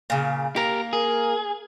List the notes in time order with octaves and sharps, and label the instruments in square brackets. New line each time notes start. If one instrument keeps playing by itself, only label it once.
[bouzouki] A#2 C#3
[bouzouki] A#3 [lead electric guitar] G4 A#4
[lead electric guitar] G#4 [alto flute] A#4